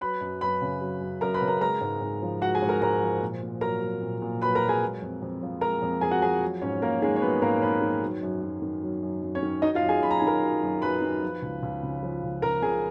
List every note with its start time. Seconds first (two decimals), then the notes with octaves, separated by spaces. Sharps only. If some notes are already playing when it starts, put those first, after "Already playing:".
0.01 F#3 B4 B5
0.21 F#2
0.41 F#2 B4 B5
0.62 C#3
0.81 F#3
1.01 F#2
1.21 F#2 A#4 A#5
1.34 B4 B5
1.42 C#3
1.48 A#4 A#5
1.61 G#3 A#4 A#5
1.81 G#2
2.01 G#2
2.22 F3
2.41 G#3 F#4 F#5
2.55 G#4 G#5
2.62 G#2
2.69 A#4 A#5
2.82 G#2 A#4 A#5
3.02 F3
3.21 A#2
3.42 A#2
3.61 F#3 A#4 A#5
3.81 F#3
4.02 A#2
4.22 A#2
4.41 F#3 B4 B5
4.55 A#4 A#5
4.62 F#3
4.68 G#4 G#5
4.81 G#3
5.02 F2
5.22 F2
5.42 F3
5.61 G#3 A#4 A#5
5.82 F2
6.01 F2 G#4 G#5
6.11 F#4 F#5
6.22 F3 G#4 G#5
6.43 F#3
6.62 G#2 C#4 C#5
6.82 G#2 A#3 A#4
7.02 D#3 G#3 G#4
7.16 C#5
7.21 F#3 B3 B4
7.42 G#2 A#3 A#4
7.62 G#2 B3 B4
7.82 D#3
8.02 F#3
8.23 F#2
8.42 F#2
8.62 D#3
8.82 F#3
9.03 F#2
9.22 F#2
9.35 C#4 C#5
9.43 D#3
9.62 F#3 D#4 D#5
9.75 F4 F5
9.82 F#2
9.89 G#4 G#5
10.02 F#2 B5
10.11 A#5
10.19 D#3 G#5
10.27 A#4 A#5
10.43 F#3
10.62 F#2
10.82 F#2 B4 B5
11.02 D#3
11.22 F3
11.42 C#2
11.63 C#2
11.83 C#3
12.03 F3
12.23 C#2
12.42 C#2 A#4 A#5
12.62 C#3 G#4 G#5